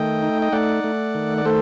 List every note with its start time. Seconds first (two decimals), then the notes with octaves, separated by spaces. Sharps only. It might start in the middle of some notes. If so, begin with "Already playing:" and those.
Already playing: D#3 A3 D#5 G5
0.23 D#4
0.42 D#5
0.52 A3 D5 F#5
0.84 A3
1.15 D#3
1.38 D5
1.46 A3 A4 C5